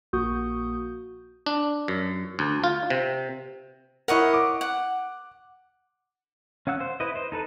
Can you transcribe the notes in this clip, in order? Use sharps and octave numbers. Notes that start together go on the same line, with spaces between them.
A#1 A#3 F#4 C#6 D#6 G6
D4
F#2
D2
F4
C3
E4 A#4 C#5 D#5 F#5
D6
F#5
C#4 F5 F#5 E6 F#6
C5
E4 B4 C5 D#5
C5 D#5
D#4 A4 B4